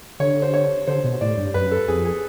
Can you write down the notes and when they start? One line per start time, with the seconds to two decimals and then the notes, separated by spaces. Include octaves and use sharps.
0.20 D3 C#5
0.42 C5
0.54 C#5
0.87 D3 C5
1.04 B2
1.21 A2 D5
1.37 G2
1.54 F#2 B4
1.71 A4
1.88 F2 G#4
2.05 G#4